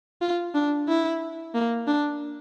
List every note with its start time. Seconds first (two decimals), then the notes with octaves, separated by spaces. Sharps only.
0.21 F4
0.55 D4
0.88 E4
1.55 A#3
1.87 D4